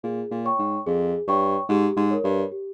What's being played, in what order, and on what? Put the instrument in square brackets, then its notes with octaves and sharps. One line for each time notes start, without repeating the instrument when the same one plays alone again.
[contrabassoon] A#2 [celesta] G#4
[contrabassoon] A#2
[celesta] C#5 G5 C#6
[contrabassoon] G#2
[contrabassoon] F2 [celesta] G#4
[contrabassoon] G2 [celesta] C#5 G5 C#6
[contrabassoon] G#2 [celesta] G4
[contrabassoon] G#2
[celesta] A#4 C#5
[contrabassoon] G2
[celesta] G4